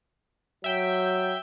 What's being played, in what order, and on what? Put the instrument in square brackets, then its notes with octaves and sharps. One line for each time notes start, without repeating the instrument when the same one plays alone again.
[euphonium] F#3 [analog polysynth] E5 G5 G6